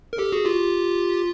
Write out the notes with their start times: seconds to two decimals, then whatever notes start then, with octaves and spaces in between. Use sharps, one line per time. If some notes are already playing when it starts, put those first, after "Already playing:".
0.13 A#4
0.18 G4 A4
0.32 F#4 G#4
0.45 F4 G4